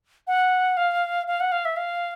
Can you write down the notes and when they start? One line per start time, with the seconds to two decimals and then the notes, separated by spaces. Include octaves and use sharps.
0.27 F#5
0.77 F5
1.27 F5
1.40 F#5
1.52 F5
1.65 E5
1.77 F5